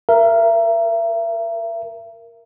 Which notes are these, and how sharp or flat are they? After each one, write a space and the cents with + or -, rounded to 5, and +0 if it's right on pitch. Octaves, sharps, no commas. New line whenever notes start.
A#4 +0 E5 +35